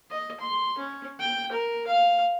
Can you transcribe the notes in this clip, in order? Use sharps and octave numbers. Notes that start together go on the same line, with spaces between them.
D#5
C6
C#4
G5
A#4
F5